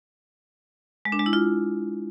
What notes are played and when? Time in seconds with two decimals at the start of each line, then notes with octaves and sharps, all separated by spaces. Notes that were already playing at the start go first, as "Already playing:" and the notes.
1.05 G#3
1.12 D4
1.19 G#3
1.26 E4
1.33 F4